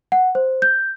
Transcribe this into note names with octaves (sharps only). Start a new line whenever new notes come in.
F#5
C5
G6